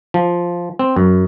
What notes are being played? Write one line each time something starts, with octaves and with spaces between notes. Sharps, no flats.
F3
C4
F#2